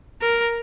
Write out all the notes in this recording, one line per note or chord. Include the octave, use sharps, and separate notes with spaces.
A#4